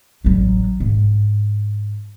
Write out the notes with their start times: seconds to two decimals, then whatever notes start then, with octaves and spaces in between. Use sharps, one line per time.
0.24 A1 F#3
0.80 G#2